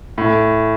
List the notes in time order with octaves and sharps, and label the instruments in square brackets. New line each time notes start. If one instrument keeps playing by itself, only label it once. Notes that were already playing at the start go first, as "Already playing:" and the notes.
[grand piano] A2